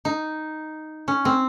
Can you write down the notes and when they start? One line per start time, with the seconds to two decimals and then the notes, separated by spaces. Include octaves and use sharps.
0.05 D#4
1.08 C#4
1.25 C4